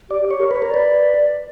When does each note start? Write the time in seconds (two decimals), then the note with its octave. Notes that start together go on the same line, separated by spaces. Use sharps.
0.10 G4 D5
0.26 G4 C#5
0.40 A#4
0.51 B4
0.56 C#5
0.62 A#4
0.70 B4 D5